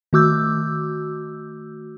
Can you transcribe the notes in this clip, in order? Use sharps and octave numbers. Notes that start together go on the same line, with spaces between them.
D#3 A3 F#4 D6 E6 G6